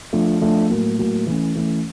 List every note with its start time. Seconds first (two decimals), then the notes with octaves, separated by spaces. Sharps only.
0.13 F3 A3 D4
0.41 F3 A3 D4
0.70 A2 F#3 A#3
0.99 A2 F#3 A#3
1.27 E3 A3 C#4
1.55 E3 A3 C#4